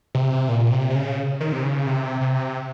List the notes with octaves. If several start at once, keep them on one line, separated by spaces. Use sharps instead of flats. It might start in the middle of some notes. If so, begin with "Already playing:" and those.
C3
A#2
C3
C3
C#3
D#3
C3
C#3
C3
C3